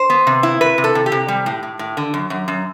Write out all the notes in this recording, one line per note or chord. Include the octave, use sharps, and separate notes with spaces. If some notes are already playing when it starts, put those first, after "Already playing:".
Already playing: C5
B3
C3
E4
C3 B4
C3
A4
C3
G4
C3
G3
A2
A2
A2
D3
F#2
F#2
F#2